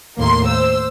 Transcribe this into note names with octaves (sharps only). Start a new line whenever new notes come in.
D#2 A2 A#3 C6
C5 E6